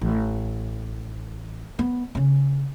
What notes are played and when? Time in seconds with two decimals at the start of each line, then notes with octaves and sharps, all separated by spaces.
0.01 A1
1.79 B3
2.15 C#3 C#4